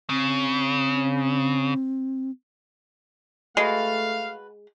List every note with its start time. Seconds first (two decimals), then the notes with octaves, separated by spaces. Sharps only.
0.10 C#3 C4
3.57 G#3 A3 F#4 B4 F5 A5